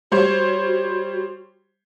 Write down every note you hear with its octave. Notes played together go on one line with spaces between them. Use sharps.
G3 F#4 C5 C#5